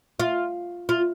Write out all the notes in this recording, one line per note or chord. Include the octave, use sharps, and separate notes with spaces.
F4
F4